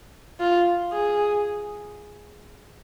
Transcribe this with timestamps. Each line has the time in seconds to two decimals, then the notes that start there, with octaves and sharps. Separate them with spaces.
0.40 F4
0.93 G#4